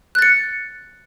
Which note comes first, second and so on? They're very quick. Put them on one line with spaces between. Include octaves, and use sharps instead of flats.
F#6 A6 C#7